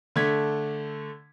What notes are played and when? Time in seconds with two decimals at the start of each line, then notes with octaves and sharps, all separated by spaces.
0.16 D3 A3 G#6 B6